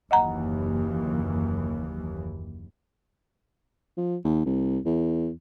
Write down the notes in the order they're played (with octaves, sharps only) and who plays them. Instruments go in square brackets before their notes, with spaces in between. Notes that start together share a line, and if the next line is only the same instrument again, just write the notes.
[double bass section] F#1 D#2 E3 [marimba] D#5 F#5 A#5
[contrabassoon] F3
D#2
C2
E2